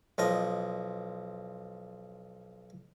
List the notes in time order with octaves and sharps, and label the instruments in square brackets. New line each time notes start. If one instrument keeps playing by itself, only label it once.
[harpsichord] B1 F3 D#5